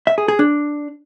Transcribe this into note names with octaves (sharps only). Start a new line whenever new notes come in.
E5
G#4
G#4
D4